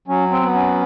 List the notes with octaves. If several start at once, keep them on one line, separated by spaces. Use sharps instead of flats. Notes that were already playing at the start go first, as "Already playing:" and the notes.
F#3 C#4
C4
B3
C#4